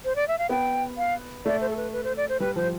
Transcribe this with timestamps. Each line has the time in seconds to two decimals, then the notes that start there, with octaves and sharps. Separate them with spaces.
0.05 C5
0.16 D5
0.28 E5
0.39 F5
0.49 B3 G5
0.98 F5
1.45 A3 D5
1.61 C5
1.69 A4
1.77 B4
1.93 B4
2.04 C5
2.17 D5
2.29 C5
2.40 G3 B4
2.56 F3 C5